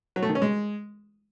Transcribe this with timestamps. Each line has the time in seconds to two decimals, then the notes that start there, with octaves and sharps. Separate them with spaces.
0.16 F#3
0.22 A3
0.29 D#3
0.35 C#4
0.42 G#3